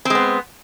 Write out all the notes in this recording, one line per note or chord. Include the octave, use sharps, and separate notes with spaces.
G#3 B3 C4